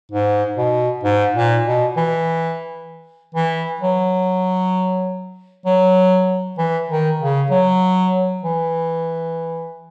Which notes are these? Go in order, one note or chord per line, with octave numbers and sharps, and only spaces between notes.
G#2
B2
G#2
A#2
B2
E3
E3
F#3
F#3
E3
D#3
C#3
F#3
E3